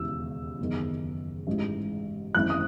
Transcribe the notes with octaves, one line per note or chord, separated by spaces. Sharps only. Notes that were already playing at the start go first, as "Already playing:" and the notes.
Already playing: E1 D#2 C#3 E3 E6
F#1 E2 D#3
A1 G#2 E3
G#1 F#2 E3 F#6
D#6